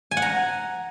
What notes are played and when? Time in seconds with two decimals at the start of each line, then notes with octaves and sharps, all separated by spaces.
0.11 G#5
0.17 F#5
0.22 A#5